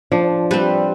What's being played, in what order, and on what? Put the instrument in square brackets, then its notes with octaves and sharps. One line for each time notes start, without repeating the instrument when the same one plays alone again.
[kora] F3 [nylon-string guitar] D4
[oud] G3 [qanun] C4 B4